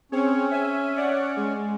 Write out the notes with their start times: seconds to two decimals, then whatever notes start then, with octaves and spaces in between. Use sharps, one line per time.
0.12 C4 C#4 G#4 C#5
0.51 E5 G#5
0.95 C#5 D5 F#5
1.37 G#3